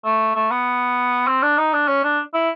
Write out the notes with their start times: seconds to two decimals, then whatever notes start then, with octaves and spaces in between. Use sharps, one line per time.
0.05 A3
0.35 A3
0.51 B3
1.27 C4
1.42 D4
1.58 D#4
1.73 D4
1.88 C#4
2.04 D4
2.34 E4